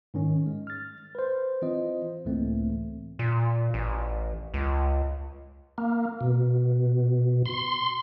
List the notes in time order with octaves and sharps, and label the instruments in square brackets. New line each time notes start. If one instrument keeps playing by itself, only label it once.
[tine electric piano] G#2 D#3 C#4
G#3
F6 A6
B4 C5
E3 C4 F4 C5 D#5
C#2 A2 E3 A3 A#3 C4
[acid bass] A#2
A1
C#2
[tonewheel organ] A#3
B2
C6